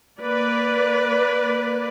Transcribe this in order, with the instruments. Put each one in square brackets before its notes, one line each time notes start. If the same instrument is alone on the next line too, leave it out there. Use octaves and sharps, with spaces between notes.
[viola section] A#3 B4 D5